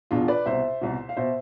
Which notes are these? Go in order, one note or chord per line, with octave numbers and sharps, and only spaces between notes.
E2 B2 D4 F4
B4 D5
C2 B2 C5 E5
C2 B2
F5
B2 C5 E5